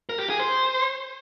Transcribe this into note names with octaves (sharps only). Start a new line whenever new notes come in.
A#4
G4
G#4
C5